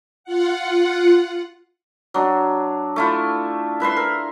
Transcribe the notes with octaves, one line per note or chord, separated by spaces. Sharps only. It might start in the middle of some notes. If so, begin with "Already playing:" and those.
F4 F#5
F#3 D4
A3 E4 F4
E4 B4 E5 C6
A#4